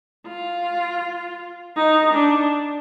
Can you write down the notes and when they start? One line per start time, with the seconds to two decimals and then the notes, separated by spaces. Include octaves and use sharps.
0.27 F4
1.76 D#4
2.14 D4